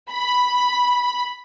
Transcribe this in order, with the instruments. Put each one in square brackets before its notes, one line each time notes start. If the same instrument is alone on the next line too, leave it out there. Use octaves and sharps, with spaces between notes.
[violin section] B5